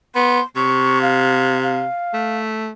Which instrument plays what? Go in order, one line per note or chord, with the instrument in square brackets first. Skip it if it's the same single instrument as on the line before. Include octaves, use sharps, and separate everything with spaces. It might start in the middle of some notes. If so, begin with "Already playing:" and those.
[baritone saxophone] B3 [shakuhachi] C6
[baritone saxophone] C3 [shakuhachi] C#6
[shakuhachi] F5
F5
[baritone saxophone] A3